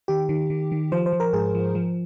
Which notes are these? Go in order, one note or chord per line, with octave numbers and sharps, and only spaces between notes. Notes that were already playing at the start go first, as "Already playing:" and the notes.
D#3 G4
D#3
D#3
D#3
F3 C5
C5
F3
A#4
G#2 G#4
F3
F3